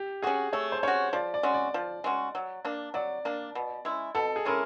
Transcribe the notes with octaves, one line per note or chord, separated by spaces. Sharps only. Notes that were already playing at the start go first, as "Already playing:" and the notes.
Already playing: G4
C#4 F#4 G#4
A3 C#5
C5
C#4 F#4 C#5
F3 D5
D5
G#3 C#4 F#4
D5
F3
G#3 C#4 F#4
F#3
A#3 D4
F#3 D5
A#3 D4
B2
G#3 C#4 E4
B2 A4
G#4
G#3 C#4 E4 A#4